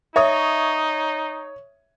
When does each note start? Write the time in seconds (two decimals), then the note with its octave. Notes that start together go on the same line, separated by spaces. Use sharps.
0.16 D#4 C#5 E5 C#6 D#6